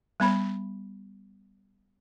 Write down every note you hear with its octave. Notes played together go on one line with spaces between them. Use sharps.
G3 B3 B5